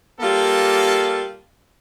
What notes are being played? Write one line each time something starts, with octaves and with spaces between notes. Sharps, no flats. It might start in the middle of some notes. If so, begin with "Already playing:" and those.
G3 A#3 F4 A4